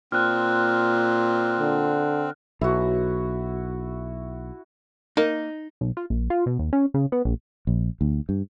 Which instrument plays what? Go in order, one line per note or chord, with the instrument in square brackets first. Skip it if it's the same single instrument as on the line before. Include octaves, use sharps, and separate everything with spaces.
[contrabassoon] A#2 [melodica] C4 [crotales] F6 F#6
[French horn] D3
[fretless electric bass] B1 [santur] E4 F#4
[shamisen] A#3 [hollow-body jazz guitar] D#4
[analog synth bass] B1
F4
A#1
F4
B2
D#2
C#4
C#3
B3
A#1
[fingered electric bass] A#1
D2
G2